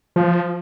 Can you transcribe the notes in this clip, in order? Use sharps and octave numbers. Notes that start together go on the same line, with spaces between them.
F3